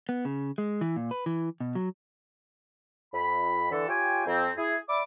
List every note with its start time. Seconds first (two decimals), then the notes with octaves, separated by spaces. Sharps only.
0.09 B3
0.25 C#3
0.58 G#3
0.81 E3
0.96 A#2
1.11 B4
1.26 E3
1.60 B2
1.75 F#3
3.14 F2 B5
3.72 D3 E3 A4
3.89 F4 G4 C#5 G5 G#5
4.27 F2 C4
4.57 E4 G#4
4.89 D5 E5 B5 D6